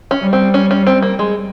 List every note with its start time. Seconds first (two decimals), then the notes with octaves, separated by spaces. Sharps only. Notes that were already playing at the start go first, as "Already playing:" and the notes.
0.11 C#4
0.22 G3
0.33 C4
0.54 C#4
0.71 C#4
0.87 C4
1.02 A#3
1.19 G#3